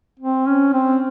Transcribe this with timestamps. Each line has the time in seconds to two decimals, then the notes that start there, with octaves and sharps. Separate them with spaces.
0.20 C4
0.47 C#4
0.74 C4